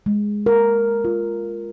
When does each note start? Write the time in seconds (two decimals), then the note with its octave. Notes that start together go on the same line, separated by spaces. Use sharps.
0.06 G#3
0.46 A#4
1.05 F4